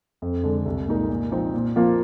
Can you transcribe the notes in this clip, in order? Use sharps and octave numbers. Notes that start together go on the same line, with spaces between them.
F2
D3 G#3
C2
A#2 G#3 D#4 A#4
A#2
F3 C4 D#4
A#2
F3 A#3 F4